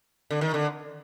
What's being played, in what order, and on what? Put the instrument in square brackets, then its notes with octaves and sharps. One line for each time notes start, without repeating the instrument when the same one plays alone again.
[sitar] D3
D#3
D3